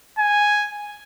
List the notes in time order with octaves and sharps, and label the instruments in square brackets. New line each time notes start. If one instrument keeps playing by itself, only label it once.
[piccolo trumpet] G#5